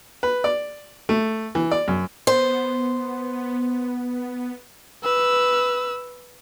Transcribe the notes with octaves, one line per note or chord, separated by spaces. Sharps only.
B4
D5
A3
E3
D5
F#2
B3 C5
B4 E6